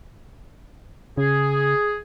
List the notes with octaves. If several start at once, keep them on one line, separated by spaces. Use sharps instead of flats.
C#3 G#4